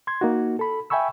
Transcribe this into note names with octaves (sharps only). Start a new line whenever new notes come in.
C6 G#6
A#3 D#4 F#4
A4 B5
E5 G5 G#5 B5 C#6 E6